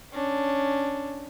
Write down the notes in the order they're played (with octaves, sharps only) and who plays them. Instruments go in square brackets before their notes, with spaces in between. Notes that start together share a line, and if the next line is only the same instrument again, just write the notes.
[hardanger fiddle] C#4 D4